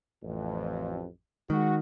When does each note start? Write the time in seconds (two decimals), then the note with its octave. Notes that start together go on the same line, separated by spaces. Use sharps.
0.24 A1 F2
1.50 D#3 G#3 F#4